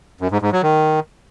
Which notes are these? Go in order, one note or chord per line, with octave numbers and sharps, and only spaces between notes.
F#2
G#2
G#2
F#3
D#3